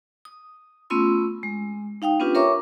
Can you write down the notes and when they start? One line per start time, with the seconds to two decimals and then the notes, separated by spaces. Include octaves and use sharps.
0.25 D#6
0.90 A3 B3 C#4 F4 C6 E6
1.43 G#3
2.02 D#4 F5 G5 D#6
2.20 B3 C#4 D4 F4 G4 B4
2.35 A#4 C#5 E5 A#5 C#6 D6